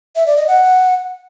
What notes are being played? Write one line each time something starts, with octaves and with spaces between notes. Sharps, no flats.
E5
D5
D#5
F#5